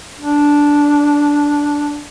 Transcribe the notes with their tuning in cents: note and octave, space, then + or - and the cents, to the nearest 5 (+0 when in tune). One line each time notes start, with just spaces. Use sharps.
D4 -10